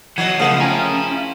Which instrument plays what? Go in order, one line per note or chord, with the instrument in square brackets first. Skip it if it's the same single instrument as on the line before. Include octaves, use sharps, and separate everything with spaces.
[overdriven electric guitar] E3 D#5 [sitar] F#3 [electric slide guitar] F#5 [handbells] G#6 C7
[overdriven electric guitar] B1 C#3 [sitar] F3 [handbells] A3 G#4 A#4
[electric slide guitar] C#4 [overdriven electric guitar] E4 [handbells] G5 G#5 A#5